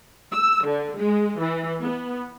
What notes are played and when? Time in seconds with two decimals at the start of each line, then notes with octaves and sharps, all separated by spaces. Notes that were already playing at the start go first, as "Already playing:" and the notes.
0.31 E6
0.64 D3
0.98 G#3
1.40 E3
1.81 B3